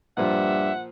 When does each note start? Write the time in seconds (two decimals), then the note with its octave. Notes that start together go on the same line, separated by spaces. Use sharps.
0.17 G2 A#2 F3 E5 F#5